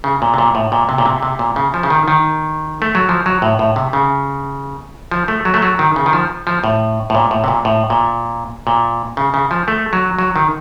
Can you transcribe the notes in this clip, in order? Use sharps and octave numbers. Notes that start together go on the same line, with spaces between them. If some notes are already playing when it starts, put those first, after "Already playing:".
C#3
A#2
C3
A#2
A2
A#2
C3
A#2
C3
C3
A#2
C#3
F3
C#3
D#3
D#3
A3
F#3
F3
F#3
A2
A2
C3
C#3
F3
A3
F#3
A3
F#3
D#3
C#3
D#3
F3
F3
A2
A2
A#2
A2
C3
A#2
A2
A#2
A#2
C#3
C#3
F3
A3
F#3
F#3
D#3